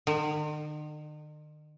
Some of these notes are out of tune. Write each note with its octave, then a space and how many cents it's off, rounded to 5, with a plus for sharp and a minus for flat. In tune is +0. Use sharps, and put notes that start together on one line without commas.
D#3 -45